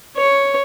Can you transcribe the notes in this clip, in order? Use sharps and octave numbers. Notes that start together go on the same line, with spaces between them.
C#5